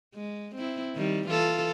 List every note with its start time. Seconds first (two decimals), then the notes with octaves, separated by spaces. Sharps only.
0.15 G#3
0.56 C4 E4
0.96 D#3 G3
1.28 E3 F4 A4